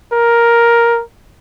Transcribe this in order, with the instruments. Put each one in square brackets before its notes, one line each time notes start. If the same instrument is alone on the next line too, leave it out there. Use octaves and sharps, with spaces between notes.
[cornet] A#4